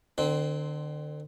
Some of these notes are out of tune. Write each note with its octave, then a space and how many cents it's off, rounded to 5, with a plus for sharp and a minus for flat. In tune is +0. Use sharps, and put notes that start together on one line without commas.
D3 +35 C4 -5